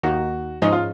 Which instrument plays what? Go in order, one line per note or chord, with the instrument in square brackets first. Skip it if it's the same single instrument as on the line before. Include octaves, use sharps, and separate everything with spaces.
[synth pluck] D#2 D#3 A#3 D#4 [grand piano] F#4
[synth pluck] G#2 F3 G#3 C#4 [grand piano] D#4
[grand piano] F4